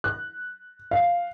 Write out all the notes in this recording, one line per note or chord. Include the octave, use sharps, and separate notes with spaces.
F#6
F5